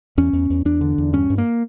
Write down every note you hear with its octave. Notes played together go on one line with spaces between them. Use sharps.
E2 C#4
E2
E2
E2 D4
D3
E2
G2 C#4
G2
A#3